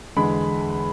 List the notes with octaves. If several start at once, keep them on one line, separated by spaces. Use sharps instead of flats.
E2 D3 G#3 B5